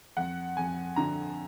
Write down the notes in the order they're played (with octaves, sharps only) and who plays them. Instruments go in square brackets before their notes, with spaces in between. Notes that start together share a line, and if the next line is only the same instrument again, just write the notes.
[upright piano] F2 F#5
F2 G#5
D3 A#5